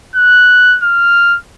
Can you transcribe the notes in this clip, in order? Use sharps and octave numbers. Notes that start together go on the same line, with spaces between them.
F#6
F6